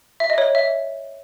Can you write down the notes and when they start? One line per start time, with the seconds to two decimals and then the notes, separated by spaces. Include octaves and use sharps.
0.20 E5
0.30 D#5
0.38 C#5
0.55 E5